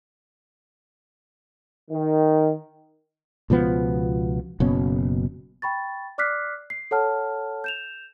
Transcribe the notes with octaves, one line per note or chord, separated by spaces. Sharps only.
D#3
C#2 B2 F3 B3
F#1 B2 C#4
G5 B5 C#6 A6
D5 D6 F6 F#6 B6 C7
C7
A4 C#5 F#5 A5 F6
G6 E7 F7